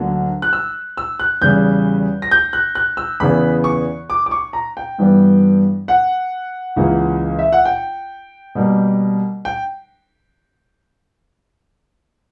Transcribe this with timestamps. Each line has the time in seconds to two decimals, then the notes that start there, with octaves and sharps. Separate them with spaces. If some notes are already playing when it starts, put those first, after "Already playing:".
Already playing: D2 D3 F#3 A#3
0.42 F#6
0.53 E6
0.97 E6
1.20 F#6
1.41 E2 C#3 G3 G6
2.22 A#6
2.31 G6
2.53 F#6
2.75 F#6
2.97 E6
3.20 E2 C#3 E3 B3 B5
3.64 C#6
4.10 D6
4.26 D6
4.31 C#6
4.53 A#5
4.77 G5
4.98 G2 E3 G3 B3
5.88 F#5
6.76 C#2 C#3 E3 A#3
7.39 E5
7.52 F#5
7.65 G5
8.55 B2 G3 A#3
9.45 G5